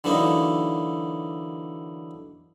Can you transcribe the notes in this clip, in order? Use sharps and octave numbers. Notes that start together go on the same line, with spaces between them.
D3 E3 F#3 A#3 D#4